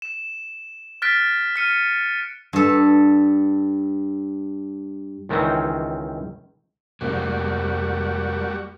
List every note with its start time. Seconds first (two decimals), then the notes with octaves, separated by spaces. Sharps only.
0.02 E7
1.02 F6 F#6 A6 B6 D7
1.56 F6 C#7 D#7
2.53 G2 A4
5.29 C#2 D#3 E3 C4 C#4
7.01 F1 F2 G3 G#3 A#3 F#4